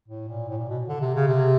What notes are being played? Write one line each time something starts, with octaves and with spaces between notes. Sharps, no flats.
A2
A#2
A2
A#2
B2
D3
C3
C#3
C3